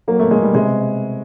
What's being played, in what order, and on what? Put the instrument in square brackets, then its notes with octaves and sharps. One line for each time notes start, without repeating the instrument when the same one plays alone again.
[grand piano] F#3 A#3
B2 A3
G#3
B2 G3
C3 G#3